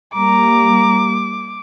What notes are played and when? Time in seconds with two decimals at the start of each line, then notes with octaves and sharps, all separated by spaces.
0.14 G3 A#3 A#5 D6